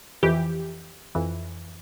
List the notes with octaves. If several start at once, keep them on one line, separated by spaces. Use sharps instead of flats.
F2 E3 G4
F2 E3